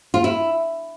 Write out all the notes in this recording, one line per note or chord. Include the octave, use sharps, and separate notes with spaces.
F4
E4